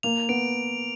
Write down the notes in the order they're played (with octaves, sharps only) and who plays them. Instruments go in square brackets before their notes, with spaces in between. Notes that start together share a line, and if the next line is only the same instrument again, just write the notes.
[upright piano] A#3 [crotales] F7
[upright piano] B3 [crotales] D7